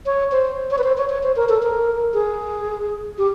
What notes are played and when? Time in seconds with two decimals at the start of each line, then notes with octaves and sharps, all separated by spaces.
0.06 C#5
0.32 C5
0.71 C#5
0.78 B4
0.84 C5
0.97 C#5
1.09 C#5
1.23 C5
1.36 A#4
1.49 A4
1.62 A#4
2.14 G#4
3.18 G4